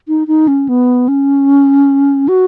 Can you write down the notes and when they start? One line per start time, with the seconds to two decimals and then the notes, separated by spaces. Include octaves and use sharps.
0.08 D#4
0.27 D#4
0.48 C#4
0.69 B3
1.08 C#4
2.28 F#4